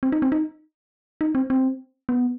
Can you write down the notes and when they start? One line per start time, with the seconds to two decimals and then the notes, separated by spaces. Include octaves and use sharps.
0.03 C4
0.12 D#4
0.22 C4
0.32 D#4
1.21 D#4
1.35 C4
1.50 C4
2.09 B3